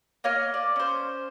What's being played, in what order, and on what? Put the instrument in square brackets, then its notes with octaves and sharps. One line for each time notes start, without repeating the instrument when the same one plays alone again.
[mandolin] A#3 C#5 D#5 F6
D5
C#4 C5